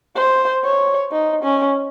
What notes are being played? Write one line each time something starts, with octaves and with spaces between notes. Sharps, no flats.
C5
C#5
D#4
C#4